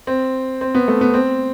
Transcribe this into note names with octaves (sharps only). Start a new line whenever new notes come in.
C4
C4
B3
A3
B3
C4